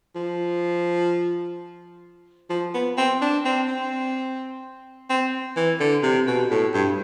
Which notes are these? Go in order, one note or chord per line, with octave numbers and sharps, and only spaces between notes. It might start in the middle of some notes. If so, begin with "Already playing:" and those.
F3
F3
B3
C4
D4
C4
C4
C4
E3
D3
C3
B2
A2
G2